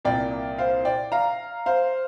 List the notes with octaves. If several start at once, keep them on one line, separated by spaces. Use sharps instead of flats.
C2 A#2 A#3 D5 G5
C5 F5
D5 G5
F5 A#5
C5 F5